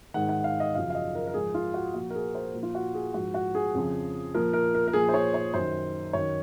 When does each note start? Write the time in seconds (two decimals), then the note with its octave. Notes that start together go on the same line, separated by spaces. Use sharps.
0.14 G#2 D#3 F#5
0.29 F#5
0.44 F5
0.60 D#5
0.75 F#2 C#3 F3 F5
0.90 F5
0.95 D#5
1.15 A#4
1.27 A#4
1.34 G#2 F3 G#4
1.54 F4
1.74 F#4
1.94 A#2 F3 F#4
2.10 A#4
2.15 G#4
2.35 C5
2.54 A#2 F3
2.63 F4
2.75 F#4
2.94 G#4
3.14 G#2 F3 F#4
3.34 F#4
3.55 G#4
3.74 F2 C#3 F3
4.34 A#2 F3 A#4
4.53 A#4
4.75 A#4
4.88 A#4
4.93 A#2 F3 G#4
5.09 C5
5.14 C#5
5.34 C#5
5.53 F#2 D#3 C5
6.13 F#2 D#3 C#5